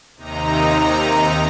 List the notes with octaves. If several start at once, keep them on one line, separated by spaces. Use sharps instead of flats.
D#2 C3 D#4 A#5